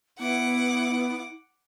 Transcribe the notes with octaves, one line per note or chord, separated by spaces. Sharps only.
B3 E4 F#5 D6